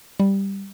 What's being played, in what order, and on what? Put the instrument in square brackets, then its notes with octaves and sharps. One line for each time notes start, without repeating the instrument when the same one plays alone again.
[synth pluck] G3